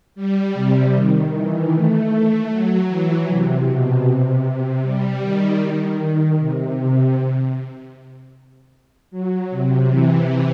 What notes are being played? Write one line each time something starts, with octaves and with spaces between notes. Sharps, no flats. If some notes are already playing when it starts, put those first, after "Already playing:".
G3
C3
D#3
E3
A3
F#3
E3
C3
B2
C3
C3
G3
D#3
D#3
C3
C3
F#3
C3
E3